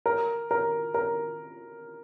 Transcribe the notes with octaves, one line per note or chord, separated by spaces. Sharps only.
A#4
A#4
A#4